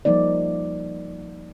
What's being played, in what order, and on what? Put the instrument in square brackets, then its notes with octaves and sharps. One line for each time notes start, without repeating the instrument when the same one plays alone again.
[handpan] F3 G3 A#3 D#4 D5